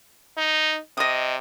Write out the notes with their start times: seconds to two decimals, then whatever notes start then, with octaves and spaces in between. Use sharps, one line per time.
0.38 D#4
0.97 C3 D#5 D#6